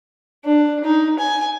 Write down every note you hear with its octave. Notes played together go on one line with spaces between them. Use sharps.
D4
D#4
G#5